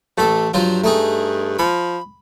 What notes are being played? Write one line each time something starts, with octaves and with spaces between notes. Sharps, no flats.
A1 A3 A4
G2 F3 F#3 F4
A3 D#4 G#4
F3 B5